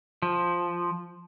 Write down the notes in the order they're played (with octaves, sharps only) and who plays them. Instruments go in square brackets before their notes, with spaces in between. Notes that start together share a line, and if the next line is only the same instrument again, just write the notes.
[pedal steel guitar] F3